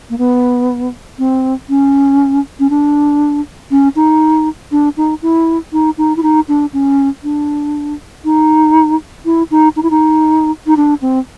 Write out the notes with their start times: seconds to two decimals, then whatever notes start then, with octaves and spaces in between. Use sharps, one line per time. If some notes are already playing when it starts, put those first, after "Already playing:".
0.10 A#3
0.18 B3
1.19 C4
1.69 C#4
2.60 C#4
2.70 D4
3.71 C#4
3.96 D#4
4.71 D4
4.97 D#4
5.22 E4
5.73 D#4
5.98 D#4
6.16 E4
6.23 D#4
6.48 D4
6.73 C#4
7.24 D4
8.25 D#4
9.25 E4
9.51 D#4
9.76 D#4
9.83 E4
9.91 D#4
10.67 D#4
10.77 D4
11.02 C4